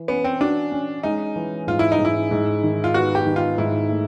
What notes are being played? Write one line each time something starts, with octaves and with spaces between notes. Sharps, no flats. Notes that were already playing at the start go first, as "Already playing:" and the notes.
Already playing: E3
B3 C#4
C4
D4 F#4
C#4
G#3 D#4
E3
G#2 F4
E4
D#4
G#2
E4
G#2
D#3
F4
B3 F#4
G4
D#3
F4
G#2 E4
A3